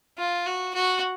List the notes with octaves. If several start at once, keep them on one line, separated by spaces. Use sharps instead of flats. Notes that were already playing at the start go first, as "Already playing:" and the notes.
F4
F#4
F#4